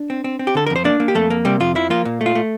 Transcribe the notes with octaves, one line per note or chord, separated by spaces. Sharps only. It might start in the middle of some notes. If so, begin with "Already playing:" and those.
Already playing: D4
C4
C4
C4
G4
D3 A4
F2 A#4
C5
A#3 D4 D5
A#3
G4
F2 A3 A4
A#3
C3 G3 G4
F2 F4
F3 E4
A#3 F4
A#2
A3
F4
A3